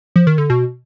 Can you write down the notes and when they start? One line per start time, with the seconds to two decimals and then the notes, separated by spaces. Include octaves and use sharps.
0.16 F3
0.27 D#3
0.38 D3
0.50 B2